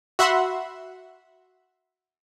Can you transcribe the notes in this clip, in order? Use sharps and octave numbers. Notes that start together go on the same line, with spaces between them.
F#4 E5 F#5 B5 C6